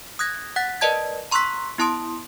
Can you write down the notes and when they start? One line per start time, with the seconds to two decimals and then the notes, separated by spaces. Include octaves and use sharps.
0.19 D#6 F#6 G#6 A#6
0.56 F#5 F#6 A6 B6
0.81 A#4 B4 D5 D#5 A5 G#6
1.31 A#5 C6 C#6 E6 F#6 B6
1.78 B3 E4 A5 C6 D#6 D7